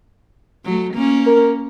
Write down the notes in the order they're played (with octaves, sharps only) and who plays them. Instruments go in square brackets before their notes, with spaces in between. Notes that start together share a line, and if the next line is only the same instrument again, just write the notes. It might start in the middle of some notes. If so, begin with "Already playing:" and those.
[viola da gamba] F#3 A3
A#3 C#4
[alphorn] A#4